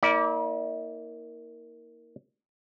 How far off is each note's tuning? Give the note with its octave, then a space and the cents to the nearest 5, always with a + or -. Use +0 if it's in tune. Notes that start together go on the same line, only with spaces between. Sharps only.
A#3 +0 E4 -45 D5 -10